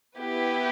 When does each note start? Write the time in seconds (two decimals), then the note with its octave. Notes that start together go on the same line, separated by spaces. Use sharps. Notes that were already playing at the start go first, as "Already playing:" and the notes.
0.18 B3 E4 G4 B4